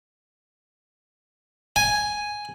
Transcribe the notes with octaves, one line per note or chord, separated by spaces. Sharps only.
G#5